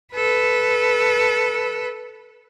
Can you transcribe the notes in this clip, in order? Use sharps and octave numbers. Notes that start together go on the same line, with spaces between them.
A4 B4